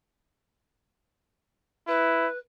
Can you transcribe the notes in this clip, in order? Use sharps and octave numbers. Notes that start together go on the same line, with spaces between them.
E4 B4